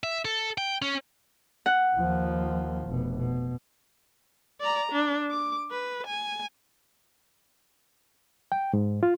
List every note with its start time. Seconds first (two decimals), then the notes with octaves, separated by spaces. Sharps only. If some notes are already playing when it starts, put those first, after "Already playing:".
0.04 E5
0.25 A4
0.58 G5
0.82 C#4
1.66 F#5
1.96 D#2 F3
2.88 F1 B2
3.18 B2
4.60 D5 A#5
4.92 D4
5.30 D6
5.71 B4
6.07 G#5
8.52 G5
8.73 G#2
9.03 F4